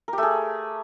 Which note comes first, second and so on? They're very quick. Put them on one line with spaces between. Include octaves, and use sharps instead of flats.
A#4 G4 A3 G#4